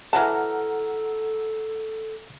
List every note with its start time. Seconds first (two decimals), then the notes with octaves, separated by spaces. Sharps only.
0.13 E3 F#3 A4 F#5 A5 A#5 F6